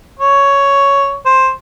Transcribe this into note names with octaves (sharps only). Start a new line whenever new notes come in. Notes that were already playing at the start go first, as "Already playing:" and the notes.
C#5
C5